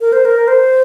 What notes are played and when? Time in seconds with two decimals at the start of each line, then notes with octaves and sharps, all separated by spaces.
0.01 A#4
0.12 C5
0.25 A#4
0.48 C5